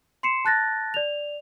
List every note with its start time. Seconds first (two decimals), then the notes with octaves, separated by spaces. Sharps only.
0.23 C6 C7 C#7 E7
0.45 A5 F#6 A6 A#6
0.94 D5 F7